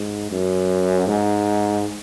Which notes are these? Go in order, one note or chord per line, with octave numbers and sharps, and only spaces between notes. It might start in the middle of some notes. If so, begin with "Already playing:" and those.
Already playing: G#2
F#2
G#2